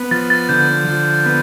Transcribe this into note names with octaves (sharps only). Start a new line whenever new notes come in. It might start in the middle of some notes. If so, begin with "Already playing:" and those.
Already playing: B3
F3 A6
A6
D3 G6
F3
B3